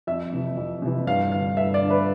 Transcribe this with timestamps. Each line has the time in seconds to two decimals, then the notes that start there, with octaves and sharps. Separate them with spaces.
0.07 F2 E5
0.32 C3 E3
0.57 F2
0.82 C3 E3
1.07 G2 F5
1.32 D3 F5
1.57 G2 E5
1.74 D5
1.82 D3
1.90 B4